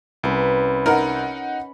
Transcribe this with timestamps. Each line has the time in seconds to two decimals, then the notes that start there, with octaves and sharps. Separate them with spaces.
0.23 C2 C#4 B4 A#5
0.86 D#4 A#4 F#5